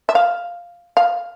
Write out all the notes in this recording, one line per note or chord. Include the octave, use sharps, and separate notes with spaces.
E5
F5
F5